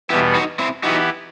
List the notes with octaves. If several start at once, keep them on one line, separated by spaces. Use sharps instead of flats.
E2 B2 G3 B3 E4 G4
D#4 F#4
C4 E4
E3 B3 D#4 E4 F#4 G4